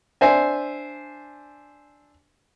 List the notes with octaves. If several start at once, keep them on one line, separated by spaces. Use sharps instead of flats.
D4 C5 E5 G#5